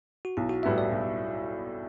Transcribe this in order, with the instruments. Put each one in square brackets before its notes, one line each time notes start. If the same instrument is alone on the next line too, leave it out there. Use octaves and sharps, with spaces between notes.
[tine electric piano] F#4
[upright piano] B1 [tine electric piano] E4
[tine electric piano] F#4
[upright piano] A2 G3 B3 E4 [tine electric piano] E5
[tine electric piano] D5
[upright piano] B1